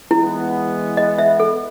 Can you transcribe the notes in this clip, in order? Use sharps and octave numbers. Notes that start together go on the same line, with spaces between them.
E3 G#3 B3 E4
D#5
E5
A4